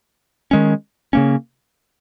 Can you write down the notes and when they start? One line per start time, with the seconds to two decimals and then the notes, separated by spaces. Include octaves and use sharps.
0.51 D#3 G#3 C#4
1.13 C#3 A#3 C#4